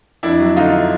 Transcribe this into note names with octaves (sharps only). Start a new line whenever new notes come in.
F2 D4 E4
F#3
D3 D#4 F4